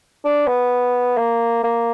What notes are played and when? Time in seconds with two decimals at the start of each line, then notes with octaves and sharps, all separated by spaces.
0.24 D4
0.47 B3
1.17 A#3
1.64 A#3